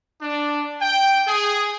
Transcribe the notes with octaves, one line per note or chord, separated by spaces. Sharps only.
D4
G5
G#4